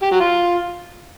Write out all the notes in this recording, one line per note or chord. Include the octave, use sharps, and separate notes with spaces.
G4
F#3
F4